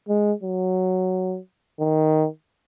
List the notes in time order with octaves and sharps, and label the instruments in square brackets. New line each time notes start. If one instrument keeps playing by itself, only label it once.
[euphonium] G#3
F#3
D#3